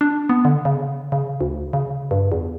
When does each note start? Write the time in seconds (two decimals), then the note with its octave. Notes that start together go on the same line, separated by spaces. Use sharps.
0.01 D4
0.29 B3
0.45 D3
0.65 C#3
1.12 C#3
1.41 D2
1.73 C#3
2.11 G2
2.32 E2